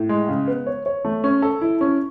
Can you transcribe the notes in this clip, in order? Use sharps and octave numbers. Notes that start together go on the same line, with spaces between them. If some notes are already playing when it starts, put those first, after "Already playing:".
Already playing: A2
G#3
C#3
B3
C#5
C#5
A3
C#4
A4
E4
C#4